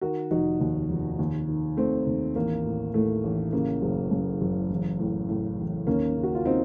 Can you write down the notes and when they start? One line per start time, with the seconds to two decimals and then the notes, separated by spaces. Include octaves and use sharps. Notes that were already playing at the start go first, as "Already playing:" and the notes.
0.01 D#3 F#4 A#4
0.31 F1 D#4 F#4
0.60 D#2
0.90 F1
1.19 D#2
1.48 D#3
1.77 D#3 A3 C4
2.07 D#2
2.36 A1 A#3
2.65 A2
2.94 A2 A3
3.24 A1
3.53 C#3 A#3
3.82 F#1
4.11 F#2
4.41 F#1
4.70 A1
4.99 A2
5.29 A2
5.58 A1
5.87 D#2 A#3 C#4
6.16 C#3
6.23 F#4
6.35 F4
6.45 C#3 C4 D#4